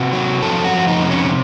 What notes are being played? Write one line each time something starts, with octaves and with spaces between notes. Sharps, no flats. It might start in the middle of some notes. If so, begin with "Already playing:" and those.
Already playing: C3 F#4
F#3
F2 A4
F#4
F2
D#4
C3
C#4